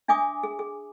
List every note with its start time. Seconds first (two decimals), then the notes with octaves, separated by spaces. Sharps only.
0.08 D4 E5 G#5 D6 D#6
0.43 G#4
0.59 G#4